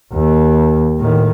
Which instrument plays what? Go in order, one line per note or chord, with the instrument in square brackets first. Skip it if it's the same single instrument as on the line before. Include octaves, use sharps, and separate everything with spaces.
[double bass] D#2
A2 D#3